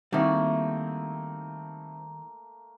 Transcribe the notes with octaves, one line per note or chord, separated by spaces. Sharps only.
D#3 G3 A3 A#3 C4 D#4 E4 F#4